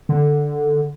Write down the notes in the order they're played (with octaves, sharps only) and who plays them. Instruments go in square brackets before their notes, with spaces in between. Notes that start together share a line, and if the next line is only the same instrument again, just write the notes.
[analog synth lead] D3